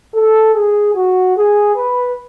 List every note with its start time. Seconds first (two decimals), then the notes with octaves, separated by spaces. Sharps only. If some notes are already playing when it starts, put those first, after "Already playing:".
0.15 A4
0.55 G#4
0.95 F#4
1.37 G#4
1.76 B4